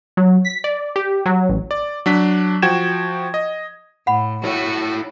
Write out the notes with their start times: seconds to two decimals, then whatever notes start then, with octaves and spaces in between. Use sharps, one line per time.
0.17 F#3
0.45 B6
0.64 D5
0.96 G4
1.26 F#3
1.49 A1
1.71 D5
2.06 F#3 D4 B6
2.62 F3 F#4 G5 G#6 E7
3.34 D#5
4.07 A2 F#5 B5
4.44 E4 F#4 C#5